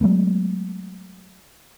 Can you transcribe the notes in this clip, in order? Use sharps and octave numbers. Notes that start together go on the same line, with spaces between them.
F#3 G#3 A3 B3